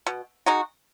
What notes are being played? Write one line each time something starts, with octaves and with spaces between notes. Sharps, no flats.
B2
G#3 D#4 F#4